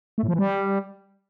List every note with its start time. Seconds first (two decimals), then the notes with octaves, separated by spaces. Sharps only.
0.18 A3
0.23 A2
0.28 F3
0.34 E3
0.39 G3